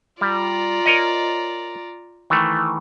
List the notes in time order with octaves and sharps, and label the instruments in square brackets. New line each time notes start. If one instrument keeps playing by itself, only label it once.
[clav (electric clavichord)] G3 [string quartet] F4 D5 A#5
[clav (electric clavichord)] A#4 C#5 D#5
D#3 E3 A3